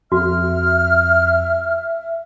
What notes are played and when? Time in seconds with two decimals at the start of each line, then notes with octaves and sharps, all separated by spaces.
0.12 F2 F#4 E5 F6